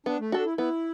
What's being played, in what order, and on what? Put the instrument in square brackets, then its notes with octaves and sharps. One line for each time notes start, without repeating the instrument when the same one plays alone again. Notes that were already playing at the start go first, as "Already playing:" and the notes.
[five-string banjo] B3 [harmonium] D4
[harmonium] A3
[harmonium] D4 [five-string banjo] F#4 A4
[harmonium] E4
[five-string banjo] B3 [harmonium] E4